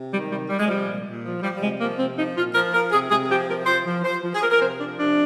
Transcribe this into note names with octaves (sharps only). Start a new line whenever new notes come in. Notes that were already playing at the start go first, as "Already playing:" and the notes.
Already playing: C3
D#3 G3
C3 G3
C3 G3
G#3
F3 G3
A#2
A#2
F3
F3 G3
G3
C3 G#3
F3 A#3
C3 C4
F3 D#4
A#2 F4
F3 A#4
F3 A#4
C3 G#4
C3 G#4
F3 G4
F3 A#4
F3 C5
F3
F3 C5
F3
G#4
F3 A#4
A#4
C3 C5
F3 D4
C3 D4